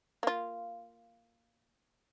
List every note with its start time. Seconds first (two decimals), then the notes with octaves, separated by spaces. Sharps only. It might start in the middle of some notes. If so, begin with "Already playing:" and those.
0.23 A#3 F4